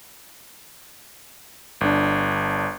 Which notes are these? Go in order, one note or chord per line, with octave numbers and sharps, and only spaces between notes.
G1 D4